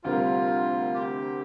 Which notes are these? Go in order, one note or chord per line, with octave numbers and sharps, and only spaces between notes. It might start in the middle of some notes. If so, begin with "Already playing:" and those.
D2 C3 G3 C4 F4 A#4
G4